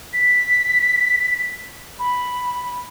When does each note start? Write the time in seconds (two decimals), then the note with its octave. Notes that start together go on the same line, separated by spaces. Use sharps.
0.13 B6
1.99 B5